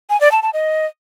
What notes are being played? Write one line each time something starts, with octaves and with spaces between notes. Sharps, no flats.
G#5
D5
A5
A5
D#5